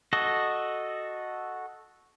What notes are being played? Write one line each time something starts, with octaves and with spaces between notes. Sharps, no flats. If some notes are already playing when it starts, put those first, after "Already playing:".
F#4 A4 D#5